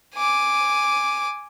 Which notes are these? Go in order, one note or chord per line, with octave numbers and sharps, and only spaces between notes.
G#5 D6